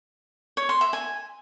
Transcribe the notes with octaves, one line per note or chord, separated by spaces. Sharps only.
C#5
C6
E5
G#5